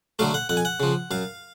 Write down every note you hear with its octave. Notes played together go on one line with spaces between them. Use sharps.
D3 F#3 A3 F5
F#5
F2 F#5
G#5
F#5
C#3 F3
F#2 F5